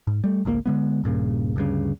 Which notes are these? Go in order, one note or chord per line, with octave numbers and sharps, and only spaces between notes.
G#2
G3 A3
G#1 C#2 D3 A#3
D3 G#3 B3
D#1 G2 A#2 C#3
D2 G2 C#3